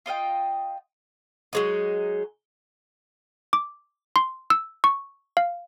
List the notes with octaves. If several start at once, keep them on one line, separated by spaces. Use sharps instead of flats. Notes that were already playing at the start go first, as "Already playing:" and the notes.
F4 D#5 F5 G5
F#3 G#3 D#4
D6
C6
E6
C#6
F5